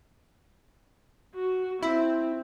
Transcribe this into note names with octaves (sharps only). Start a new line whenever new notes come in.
F#4
C4 E4